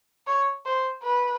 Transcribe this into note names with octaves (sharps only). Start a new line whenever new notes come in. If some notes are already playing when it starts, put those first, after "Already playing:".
C#5
C5
B4